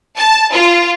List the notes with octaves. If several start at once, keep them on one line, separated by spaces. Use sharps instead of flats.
A5
F4